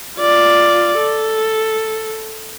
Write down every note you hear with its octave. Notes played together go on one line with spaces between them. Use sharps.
F4 D5
A4